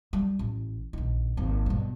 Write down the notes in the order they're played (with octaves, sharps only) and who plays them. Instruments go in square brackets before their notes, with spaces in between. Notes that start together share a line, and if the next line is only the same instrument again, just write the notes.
[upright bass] G3
A1
A#1 D#3
G#1 D#2
G2 B2